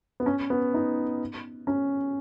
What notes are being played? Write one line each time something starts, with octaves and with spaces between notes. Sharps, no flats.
B3
C#4
B3
D#4
C#4